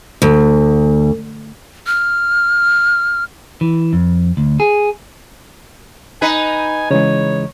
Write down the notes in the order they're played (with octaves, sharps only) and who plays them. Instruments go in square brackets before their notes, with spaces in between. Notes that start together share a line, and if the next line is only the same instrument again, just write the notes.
[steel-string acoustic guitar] D2
[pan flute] F6
[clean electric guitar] E3
F2
D2
G#4
[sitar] D#4 B4 [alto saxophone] G#5
[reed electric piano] C#3 E3 G#3 [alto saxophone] C#5